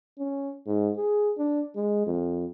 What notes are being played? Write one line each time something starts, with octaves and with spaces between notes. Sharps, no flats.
C#4
G#2
G#4
D4
G#3
F2